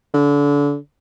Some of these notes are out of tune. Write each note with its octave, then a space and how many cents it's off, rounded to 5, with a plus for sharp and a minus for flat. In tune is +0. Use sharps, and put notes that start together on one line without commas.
D3 -30